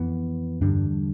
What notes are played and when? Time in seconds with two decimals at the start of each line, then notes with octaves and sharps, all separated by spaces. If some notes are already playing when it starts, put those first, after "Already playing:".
Already playing: F2 E3 B3
0.61 E2 G2 D3 G3 D4